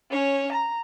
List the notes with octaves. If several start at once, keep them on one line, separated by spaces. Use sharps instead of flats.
C#4 C#5
A#5